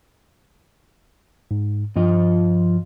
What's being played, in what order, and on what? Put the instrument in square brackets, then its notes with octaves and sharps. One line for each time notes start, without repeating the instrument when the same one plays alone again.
[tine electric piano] G#2
[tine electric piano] G2 [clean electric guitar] F3 F4 D#5